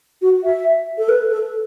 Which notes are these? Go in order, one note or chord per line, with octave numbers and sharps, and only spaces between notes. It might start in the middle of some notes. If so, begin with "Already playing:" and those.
F#4
E5
A4
B4
A4